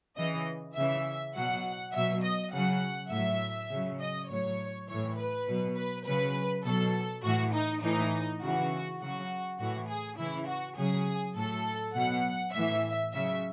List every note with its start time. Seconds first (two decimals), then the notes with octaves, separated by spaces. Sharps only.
0.17 C#3 E3 D#5
0.76 C#3 E3 E5
1.35 B2 F#3 F#5
1.93 B2 F#3 E5
2.23 D#5
2.52 C#3 F#3 F#5
3.11 A2 F#3 E5
3.70 C#3 F#3
4.00 D#5
4.29 A2 F#3 C#5
4.88 A2 E3 C#5
5.18 B4
5.48 B2 F#3
5.77 B4
6.06 C#3 F#3 B4
6.65 B2 F#3 A4
7.24 A2 E3 F#4
7.53 D#4
7.82 A2 E3 D#4
8.42 C#3 E3 F#4
9.00 C#3 F#3 F#4
9.59 A2 E3 F#4
9.89 G#4
10.18 C#3 E3 E4
10.48 F#4
10.77 C#3 F#3 G#4
11.36 A2 F#3 A4
11.95 B2 F#3 F#5
12.54 A2 E3 E5
13.13 C#3 F#3 E5